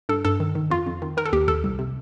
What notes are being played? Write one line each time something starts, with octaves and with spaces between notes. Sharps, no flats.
G2 A4
G2 A4
D#3
D#3
F2 F4
F2
D#3
D#3 A#4
A4
D#2 G4
D#2 A4
C2
C3